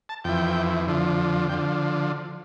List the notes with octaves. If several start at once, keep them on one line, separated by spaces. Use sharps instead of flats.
A5
F2 E3 G5
F2 D3 F3
D3 F3 G5